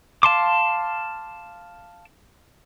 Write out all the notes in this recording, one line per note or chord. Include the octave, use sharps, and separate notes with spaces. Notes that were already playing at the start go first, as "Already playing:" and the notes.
F5 A5 C6 D6